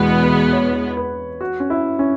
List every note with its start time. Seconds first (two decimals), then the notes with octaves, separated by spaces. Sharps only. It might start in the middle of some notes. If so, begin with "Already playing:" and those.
Already playing: E2 B2 G#3 B3 B4
0.24 B4
0.53 C#5
0.97 B4
1.41 F#4
1.60 C#4
1.70 E4
1.99 C#4